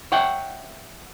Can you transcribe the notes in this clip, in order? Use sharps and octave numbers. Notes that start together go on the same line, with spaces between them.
C#5 E5 F#5 G5